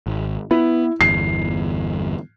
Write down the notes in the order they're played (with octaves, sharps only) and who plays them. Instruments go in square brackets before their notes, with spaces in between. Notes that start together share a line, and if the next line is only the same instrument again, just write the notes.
[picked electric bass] G#1
[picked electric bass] B3 [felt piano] E4
[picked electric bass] G1 E2 [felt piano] C7